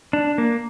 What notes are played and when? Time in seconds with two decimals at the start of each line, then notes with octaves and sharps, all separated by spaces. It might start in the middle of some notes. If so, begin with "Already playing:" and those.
0.13 D4
0.38 A#3